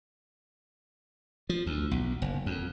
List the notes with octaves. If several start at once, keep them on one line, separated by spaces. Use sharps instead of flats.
F3
D2
B1
F#1
F2